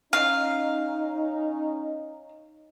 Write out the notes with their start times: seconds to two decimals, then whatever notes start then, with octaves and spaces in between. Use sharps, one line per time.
0.13 C#4 D#4 F5